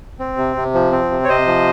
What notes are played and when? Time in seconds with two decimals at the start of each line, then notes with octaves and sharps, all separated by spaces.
0.19 C4
0.37 C3
0.56 C3
0.74 F3
0.92 C4
1.11 C3
1.24 C#5
1.28 C3 C5 D#5
1.47 F3